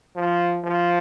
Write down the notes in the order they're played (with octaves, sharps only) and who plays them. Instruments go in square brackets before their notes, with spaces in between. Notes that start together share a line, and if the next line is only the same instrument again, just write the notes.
[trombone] F3
F3